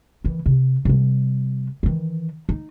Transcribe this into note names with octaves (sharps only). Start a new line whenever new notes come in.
D#3 E3
C3
C3 G3
D#3 E3
D#4